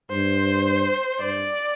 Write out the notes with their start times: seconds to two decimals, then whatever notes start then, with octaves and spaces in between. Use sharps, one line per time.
0.11 G2 C5
1.20 G2 D5